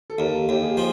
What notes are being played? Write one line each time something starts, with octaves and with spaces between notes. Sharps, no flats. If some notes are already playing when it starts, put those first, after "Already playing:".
A4
D#2 A#4
D#2 G4
G#4
F3